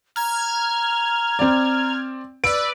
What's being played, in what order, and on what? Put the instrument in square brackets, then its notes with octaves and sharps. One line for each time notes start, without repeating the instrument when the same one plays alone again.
[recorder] A#5 [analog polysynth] F6 G#6
[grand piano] C4 D5
[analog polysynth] B4 D5 [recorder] E6 [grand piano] D7